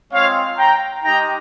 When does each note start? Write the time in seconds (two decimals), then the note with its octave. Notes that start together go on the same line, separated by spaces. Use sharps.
0.11 G#3 C4 F4 C#5 F5
0.57 G5 A#5
1.03 G#3 D#4 G4 G5 A#5